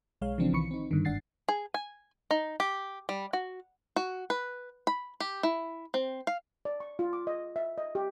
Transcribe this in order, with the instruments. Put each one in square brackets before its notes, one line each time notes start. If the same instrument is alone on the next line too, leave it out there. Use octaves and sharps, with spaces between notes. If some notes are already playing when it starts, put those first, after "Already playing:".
[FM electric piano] B1 G#3 C#5 F5
C#3 E3 F3 C4 D4
B1 D#3 E3 B5 C#6 C#7
C4 D#4
G2 D3 D#3
G1 G#2 D4 F#5 A6 C7
[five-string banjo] G#4
G#5
D#4
G4
G3
F#4
F#4
B4
B5
G4
E4
C4
F5
[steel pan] D5
C#6
F4
D6
D#5
E5
D#5
G4